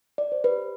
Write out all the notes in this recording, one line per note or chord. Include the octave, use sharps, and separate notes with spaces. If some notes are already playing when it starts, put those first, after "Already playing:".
D5
C5
G4 B4